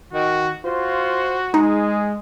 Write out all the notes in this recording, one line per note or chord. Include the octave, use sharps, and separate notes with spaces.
D#3 F#4
F4 F#4 C5
G#3 D#4 G#4